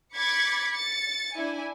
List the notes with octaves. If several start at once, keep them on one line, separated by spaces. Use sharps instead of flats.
B5 D6 G#6 A6 B6 C#7
A6 C#7
D4 E4 G#5